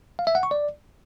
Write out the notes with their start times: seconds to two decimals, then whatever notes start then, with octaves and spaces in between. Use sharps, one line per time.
0.19 F5
0.27 E5
0.35 F#5
0.43 C#6
0.51 D5